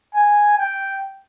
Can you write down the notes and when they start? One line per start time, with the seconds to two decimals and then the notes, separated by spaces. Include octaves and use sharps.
0.15 G#5
0.58 G5